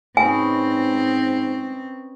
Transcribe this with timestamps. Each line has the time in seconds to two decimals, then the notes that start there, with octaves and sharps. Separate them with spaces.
0.17 G#2 C4 C#4 B4 D#5 G#5